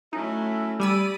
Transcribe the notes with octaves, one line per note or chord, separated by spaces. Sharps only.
F#3 A3 C#4 D#4 E4 A4
G3 D5 G#5 B5 D#6 E6